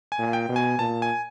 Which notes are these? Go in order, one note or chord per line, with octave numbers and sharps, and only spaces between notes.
G#5
A#2
G5
B2
G#5
A#2 A5
G#5